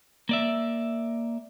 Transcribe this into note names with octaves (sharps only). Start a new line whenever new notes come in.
A#3 D5 E5